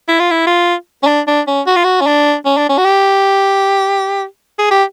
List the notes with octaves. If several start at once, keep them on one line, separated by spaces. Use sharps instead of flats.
E4
F4
E4
F4
C#4
D4
D4
C#4
F#4
F4
F#4
C#4
D4
C#4
D4
C#4
F#4
G4
G#4
G4